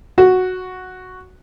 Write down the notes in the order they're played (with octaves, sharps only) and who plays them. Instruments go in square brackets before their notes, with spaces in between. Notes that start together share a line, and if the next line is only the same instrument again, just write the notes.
[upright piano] F#4